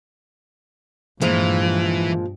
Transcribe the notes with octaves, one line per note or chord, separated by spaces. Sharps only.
G2 A#2 E3 F3 G#3